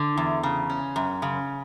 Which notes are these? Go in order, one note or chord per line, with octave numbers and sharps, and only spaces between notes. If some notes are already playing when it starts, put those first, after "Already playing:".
Already playing: D3
E2
C#3
C#4
F#2
C#3